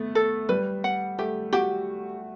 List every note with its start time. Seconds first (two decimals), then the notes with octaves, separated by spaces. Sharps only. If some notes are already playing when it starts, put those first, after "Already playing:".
Already playing: A3 B3
0.15 A4
0.49 G3 B4
0.84 F#5
1.19 A3 G4
1.53 F#4 G4